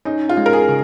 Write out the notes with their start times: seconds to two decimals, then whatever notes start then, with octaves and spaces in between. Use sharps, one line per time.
0.05 C#4 D#4
0.29 F4
0.37 G#3
0.46 A#4
0.53 G#4
0.69 C#3